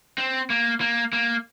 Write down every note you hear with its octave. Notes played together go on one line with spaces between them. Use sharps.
C4
A#3
A#3
A#3